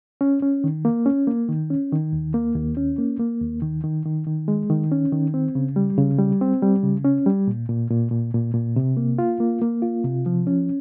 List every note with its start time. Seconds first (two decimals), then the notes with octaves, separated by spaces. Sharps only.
0.21 C#4
0.42 C#4
0.64 D#3
0.85 A#3
1.06 C#4
1.27 A#3
1.49 D#3
1.70 C#4
1.92 D#3
2.13 D#2
2.34 A#3
2.56 D#2
2.77 C#4
2.98 A#3
3.19 A#3
3.41 D#2
3.62 D#3
3.84 D#3
4.06 D#3
4.27 D#3
4.48 G#3
4.70 D#3
4.92 C#4
5.13 D#3
5.34 C4
5.55 C#3
5.76 G3
5.98 C#3
6.19 G3
6.41 C4
6.63 G3
6.83 C#3
7.05 C#4
7.26 G3
7.47 A#2
7.69 A#2
7.91 A#2
8.11 A#2
8.34 A#2
8.54 A#2
8.76 C3
8.97 A#3
9.18 F4
9.40 A#3
9.62 A#3
9.82 F4
10.04 C3
10.26 F3
10.47 C#4